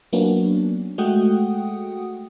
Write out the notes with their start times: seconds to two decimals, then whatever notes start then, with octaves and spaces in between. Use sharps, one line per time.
0.13 F#3 A#3 B3 C#4 D4 F#4
0.98 G#3 A3 F#4 F#5 G5 D#6